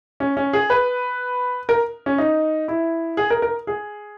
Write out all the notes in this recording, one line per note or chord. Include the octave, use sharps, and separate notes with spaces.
C#4
C#4
G#4
B4
A#4
C#4
D#4
E4
G#4
A#4
A#4
G#4